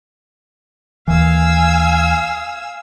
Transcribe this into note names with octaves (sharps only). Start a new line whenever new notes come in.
D#2 E3 F5 G#5 E6